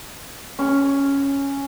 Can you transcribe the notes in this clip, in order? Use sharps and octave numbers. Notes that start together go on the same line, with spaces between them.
C#4